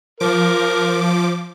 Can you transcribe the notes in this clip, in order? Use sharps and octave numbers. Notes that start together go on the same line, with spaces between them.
F3 A#4 D6